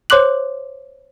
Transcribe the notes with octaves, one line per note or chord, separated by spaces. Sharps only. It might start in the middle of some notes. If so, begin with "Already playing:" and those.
C5 C#5 C6 D6 F#6 F#7